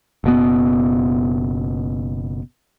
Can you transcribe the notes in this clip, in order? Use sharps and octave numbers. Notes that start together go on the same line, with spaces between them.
F#1 B2 B3